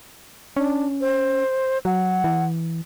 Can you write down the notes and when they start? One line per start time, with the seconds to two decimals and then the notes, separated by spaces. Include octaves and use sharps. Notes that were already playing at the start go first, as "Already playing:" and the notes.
0.57 C#4 D4
1.01 C5
1.85 F#3 F#5
2.24 E3